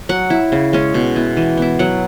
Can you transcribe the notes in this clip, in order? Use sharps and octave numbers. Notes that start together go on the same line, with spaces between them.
F#3 F#5
E4
C#3
G#3 C#4
B2
B3 E4
E3
B3 E4
F#3 F#5